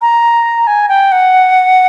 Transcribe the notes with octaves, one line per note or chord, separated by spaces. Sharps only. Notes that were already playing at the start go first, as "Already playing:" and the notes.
A#5
G#5
G5
F#5